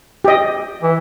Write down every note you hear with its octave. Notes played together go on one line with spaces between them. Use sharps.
G4 D#5
E3